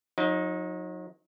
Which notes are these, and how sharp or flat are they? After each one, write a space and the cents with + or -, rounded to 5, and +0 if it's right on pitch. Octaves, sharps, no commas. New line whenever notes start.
F#3 -40 D#4 +5